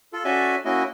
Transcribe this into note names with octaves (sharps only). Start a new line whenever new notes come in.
F4 A4
C#4 F#4 A4 D5 E5 G#5
A#3 C#4 E4 F#4 D#5